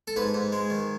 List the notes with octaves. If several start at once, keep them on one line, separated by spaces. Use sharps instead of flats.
A4
G#2 B4
G#2
G#3
D#3